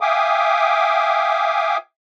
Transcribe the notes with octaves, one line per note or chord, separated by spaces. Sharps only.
E5 F5 G5 G#5 D6 D#6